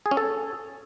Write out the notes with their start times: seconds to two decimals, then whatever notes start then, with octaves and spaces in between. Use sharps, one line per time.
0.06 G#4
0.11 C#4
0.17 A4